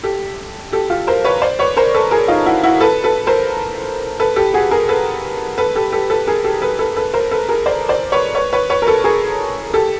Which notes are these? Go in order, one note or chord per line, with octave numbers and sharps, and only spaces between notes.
G4 A4
G4 A4
F4 G4
A#4 C5
B4 C#5
C5 D5
B4 C#5
A#4 C5
A4 B4
G#4 A#4
D#4 F4
E4 F#4
E4 F#4
A4 B4
A4 B4
A#4 C5
A4 B4
G4 A4
F#4 G#4
G#4 A#4
A4 B4
A4 B4
G4 A4
G4 A4
A4 B4
G#4 A#4
G4 A4
A4 B4
A4 B4
A4 B4
A#4 C5
A4 B4
G#4 A#4
C5 D5
C5 D5
B4 C#5
B4 C#5
B4 C#5
B4 C#5
A#4
A4 B4
G#4 A#4
G4 A4